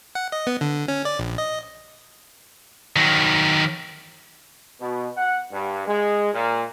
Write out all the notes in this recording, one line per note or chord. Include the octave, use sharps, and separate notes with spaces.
F#5
D#5
B3
D3
C#4
D5
A#1
D#5
D#3 F#3
B2
F#5
G2
G#3
A#2